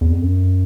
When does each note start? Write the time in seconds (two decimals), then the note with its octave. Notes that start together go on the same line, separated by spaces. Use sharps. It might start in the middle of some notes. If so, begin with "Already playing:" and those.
0.01 E2
0.12 F2
0.21 F#2